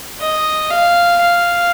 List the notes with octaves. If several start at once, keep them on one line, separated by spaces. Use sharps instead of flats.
D#5
F5
F5